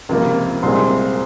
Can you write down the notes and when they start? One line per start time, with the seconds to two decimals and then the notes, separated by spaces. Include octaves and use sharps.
0.09 C#2 C3 F3 A#3
0.63 C2 A#2 G#3 C4 C6